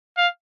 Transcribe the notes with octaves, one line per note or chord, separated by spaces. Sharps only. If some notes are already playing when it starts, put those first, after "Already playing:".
F5